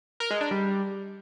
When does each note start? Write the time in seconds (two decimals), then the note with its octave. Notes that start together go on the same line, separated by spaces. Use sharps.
0.20 A#4
0.31 G#3
0.41 D4
0.51 G3